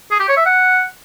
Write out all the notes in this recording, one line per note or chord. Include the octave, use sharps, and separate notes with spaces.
G#4
G4
C#5
E5
F#5